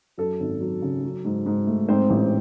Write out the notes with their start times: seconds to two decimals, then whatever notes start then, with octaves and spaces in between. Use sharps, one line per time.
0.18 F#2 A4
0.40 G#1
0.60 F#3
0.82 C#3
1.04 F#3
1.25 G#2
1.46 G#2
1.67 A3
1.89 G#2 C4 C5
2.10 A1